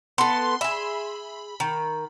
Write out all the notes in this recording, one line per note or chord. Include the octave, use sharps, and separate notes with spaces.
B3 A4 C6
G#4 E5 B5
D#3